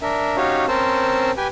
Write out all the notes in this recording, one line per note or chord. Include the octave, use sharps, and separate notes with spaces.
D4 A#4 E5
C#4 D#4 F#4 G4 C#5 F5
C4 C#4 A#4 C5 A5 E6
G4 B4 G5 G#5